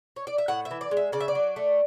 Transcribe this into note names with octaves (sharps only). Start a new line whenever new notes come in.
C#5
D5
E5
A2 F#5
E5
E3
D5
G#3
E5
C#3 D5
E5
D5
F#3
A3